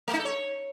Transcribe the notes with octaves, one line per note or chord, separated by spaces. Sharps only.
A3
D#4
A4
C#5